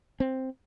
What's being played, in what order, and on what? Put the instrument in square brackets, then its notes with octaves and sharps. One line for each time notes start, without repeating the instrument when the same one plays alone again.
[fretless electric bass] C4